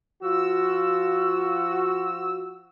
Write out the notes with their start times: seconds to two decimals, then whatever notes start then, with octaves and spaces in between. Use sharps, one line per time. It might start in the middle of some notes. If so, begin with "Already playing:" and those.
0.22 F3 F4 F#4 E6